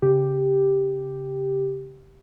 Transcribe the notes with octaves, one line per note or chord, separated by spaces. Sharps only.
C#3 G4